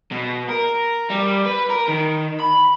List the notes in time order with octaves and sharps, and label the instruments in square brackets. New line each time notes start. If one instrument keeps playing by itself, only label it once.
[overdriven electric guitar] B2
A#4
G3
B4
A#4
D#3
B5